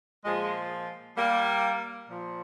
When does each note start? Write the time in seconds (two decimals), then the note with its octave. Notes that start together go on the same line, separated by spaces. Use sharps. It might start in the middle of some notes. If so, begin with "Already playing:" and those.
0.25 A#2 F3 G#3
1.16 G3 A#3
2.08 A#2 F3